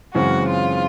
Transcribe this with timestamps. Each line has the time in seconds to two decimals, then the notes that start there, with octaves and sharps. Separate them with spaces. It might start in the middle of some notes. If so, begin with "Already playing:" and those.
0.14 F#2 C#3 E3 G#3 C4 F#4
0.47 F4